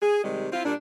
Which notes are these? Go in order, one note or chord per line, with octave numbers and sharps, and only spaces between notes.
G#4
C3 D#3 G3 G#3
C4 E4 F4
A#2 G3 D4